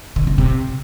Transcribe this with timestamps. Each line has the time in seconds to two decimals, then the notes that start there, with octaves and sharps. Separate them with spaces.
0.16 D3
0.27 D3
0.38 C3